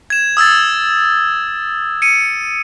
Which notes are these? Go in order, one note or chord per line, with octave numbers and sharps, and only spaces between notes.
G#6 E7
D#6 E6 G#6 A6
C#7 D#7